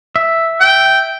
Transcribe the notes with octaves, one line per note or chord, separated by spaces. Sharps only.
E5
G5